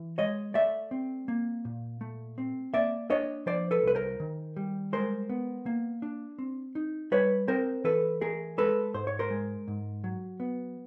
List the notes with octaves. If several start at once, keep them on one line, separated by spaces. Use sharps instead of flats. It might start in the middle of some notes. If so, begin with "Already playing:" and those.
Already playing: E3
G#3 C#5 D#5
A3 D5 E5
C4
A#3
A#2
A3
C4
A#3 D5 E5
D4 C#5 D#5
F3 C5 D5
A4 B4
C2 B4
A#4 C5
D#3
G3
G#3 A#4 C5
B3
A#3
D4
C4
D#4
G3 B4 C#5
C4 A#4 C5
E3 A4 B4
A3 G#4 A#4
G#3 A4 B4
G#2 C5
C#5
A#4 C5
G#3
G#2
F#3
B3